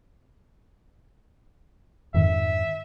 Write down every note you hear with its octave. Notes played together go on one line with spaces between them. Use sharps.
F2 G#2 D#3 E5